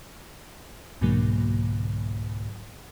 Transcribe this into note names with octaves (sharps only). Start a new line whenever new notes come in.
C2 G#2 B2 D3 F#3 A#3